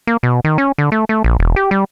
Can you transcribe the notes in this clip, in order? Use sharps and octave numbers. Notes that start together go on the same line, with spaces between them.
A#3
B2
D#3
C#4
D3
A3
A3
A#1
E1
G4
G3